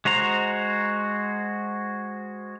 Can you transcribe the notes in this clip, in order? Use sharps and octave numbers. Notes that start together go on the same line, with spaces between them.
G#3 F#4 C5 A#5